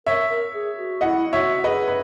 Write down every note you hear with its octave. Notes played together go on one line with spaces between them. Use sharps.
A#4 C#5 E5
A#4
G#4
F#4
E4 D#5 F#5
F#4 C#5 E5
G#4 B4 D#5
B4